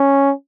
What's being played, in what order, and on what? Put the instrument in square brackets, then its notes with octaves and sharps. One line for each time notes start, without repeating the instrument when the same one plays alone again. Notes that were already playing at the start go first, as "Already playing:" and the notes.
Already playing: [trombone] C#4